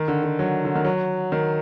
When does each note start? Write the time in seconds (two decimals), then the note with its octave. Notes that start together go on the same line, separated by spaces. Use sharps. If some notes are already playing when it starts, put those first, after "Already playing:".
Already playing: D#3
0.08 D3
0.24 D3
0.39 F#3
0.65 D3
0.75 D#3
0.85 F#3
1.32 D#3